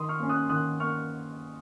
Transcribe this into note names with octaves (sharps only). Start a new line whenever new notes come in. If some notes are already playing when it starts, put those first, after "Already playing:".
Already playing: D#3 C6 D#6
C#6 F6
A#3 C#4
D#6 F#6
D#3 D#6 F#6
A#3 C#6 F6